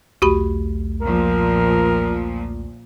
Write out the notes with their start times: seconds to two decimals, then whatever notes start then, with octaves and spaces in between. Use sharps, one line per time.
0.22 B1 E2 A3 F#4 G4 B5
1.02 A#2 F3 A#4